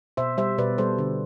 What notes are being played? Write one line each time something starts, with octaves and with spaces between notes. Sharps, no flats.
B2 C5 E5
G3 C5 E5
B2 B4 D5
G3 A4 C5
D3